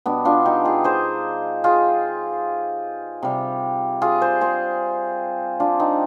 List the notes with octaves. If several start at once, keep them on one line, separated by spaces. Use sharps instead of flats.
B2 G3 B3 D4
D4 F4
D#4 G4
F4 G#4
G#4 C5
F4 G#4
C3 G3
F4 G#4
G#4 C5
G#4 C5
D4 F4
C4 D#4